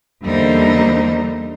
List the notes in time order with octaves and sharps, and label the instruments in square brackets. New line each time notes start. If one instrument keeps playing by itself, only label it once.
[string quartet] E2 D3 G3 A#3 D#4 C5